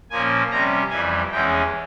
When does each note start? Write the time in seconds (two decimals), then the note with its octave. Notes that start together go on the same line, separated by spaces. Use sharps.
0.10 A#2 F3 A#3 C#4 G#5
0.51 C3 G3 C#4 A#5
0.90 F2 E3 G3 G#5
1.31 E2 E3 G#3 C#4 G5